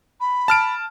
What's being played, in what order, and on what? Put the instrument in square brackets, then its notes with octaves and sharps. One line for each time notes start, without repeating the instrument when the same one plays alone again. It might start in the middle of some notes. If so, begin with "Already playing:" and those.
[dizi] B5
[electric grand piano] A5 F6 D7